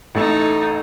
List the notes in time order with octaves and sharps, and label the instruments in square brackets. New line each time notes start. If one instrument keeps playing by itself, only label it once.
[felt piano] A1 A3 [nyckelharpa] D#4 A4